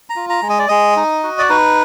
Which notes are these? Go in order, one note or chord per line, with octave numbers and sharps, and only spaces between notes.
A#5
F4
A#5
G#3
D#5
D5
G#3 D#5
D#4
F#4
D5
D#4 B4